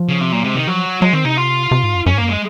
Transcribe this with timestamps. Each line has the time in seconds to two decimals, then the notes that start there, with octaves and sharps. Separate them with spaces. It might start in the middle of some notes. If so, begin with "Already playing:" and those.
Already playing: F3
0.09 C#3
0.21 C3
0.32 A#2 F#3
0.44 C3 G#3
0.55 C3 D#3
0.67 F3 F#3
1.01 F#3 G#3
1.13 D#3 C4
1.25 C3 D#4
1.37 F4
1.71 C3
1.83 G#2
1.95 F#2
2.06 F#2 C#4
2.14 G#2
2.18 F#2 A#3
2.29 G#3